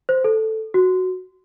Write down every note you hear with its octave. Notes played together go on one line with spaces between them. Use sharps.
C5
A4
F#4